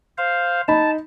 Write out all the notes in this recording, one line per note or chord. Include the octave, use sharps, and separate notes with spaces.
C5 F5
D#4 A5 B5